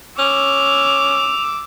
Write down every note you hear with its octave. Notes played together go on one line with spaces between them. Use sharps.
C#4 D6 E6 F7